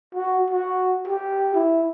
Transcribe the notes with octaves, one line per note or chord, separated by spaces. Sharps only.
F#4
F#4
G4
E4